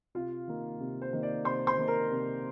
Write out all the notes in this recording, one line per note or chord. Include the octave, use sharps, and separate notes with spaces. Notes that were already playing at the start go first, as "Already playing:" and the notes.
C3 F4 F5
D#3 A#3
C3
C5
D#3 A#3
D5
C3 C5 C6
C5 C6
D#3 A#3
A#4 A#5
C3